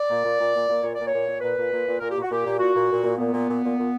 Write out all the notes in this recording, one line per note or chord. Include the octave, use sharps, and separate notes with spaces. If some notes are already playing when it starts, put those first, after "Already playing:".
Already playing: D5
A#2
A#2
A#2
A#2
A#2
A#2 C#5
A#2 D5
A#2 C#5
A#2
A#2 B4
A#2
A#2
A#2
A#2 A#4
A#2 G4
F#4
A#2 G4
A#2
A#2 F#4
A#2
A#2
A#2
A#2 B3
A#2
A#2
A#2
A#2